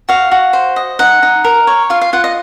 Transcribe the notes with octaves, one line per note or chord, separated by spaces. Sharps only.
F#4 F5
F#4
C5
D#5
D#4 F#5
D#4
A#4
C#5
F4 F5
F5
F4 F#5
D#5